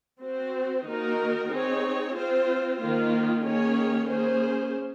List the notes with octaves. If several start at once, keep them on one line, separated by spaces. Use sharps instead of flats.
C4 F#4 C5
D#3 A#3 D#4 F#4 A#4
C4 D#4 G#4 C#5
C4 F4 C5
D#3 A#3 F4
D#3 A#3 C#4 G#4 C#5
A#3 C#4 G#4 C5